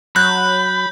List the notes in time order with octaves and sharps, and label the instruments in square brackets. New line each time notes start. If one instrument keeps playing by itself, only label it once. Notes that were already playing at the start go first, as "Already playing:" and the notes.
[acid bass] F#3 [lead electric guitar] B5 [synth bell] F#6 [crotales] G6